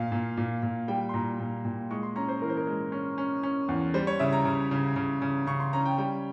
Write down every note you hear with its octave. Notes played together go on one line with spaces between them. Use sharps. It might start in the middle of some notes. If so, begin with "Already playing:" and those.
Already playing: A#2 F5
A#2
A#2
A#2
G3 G5
C6
A#2 A#5
A#2
A#2
G#3 C#6
C6
C#4 A#5
C5
E3 A#4
C5
A#4
G#3
C#4
C#4
C#4
E2
G3 C5
C#5
C#3 E5
A#5
C#3
C#3
C#3
C#3
C#3 C#6
C6
C#4 A#5
G5
G3 G5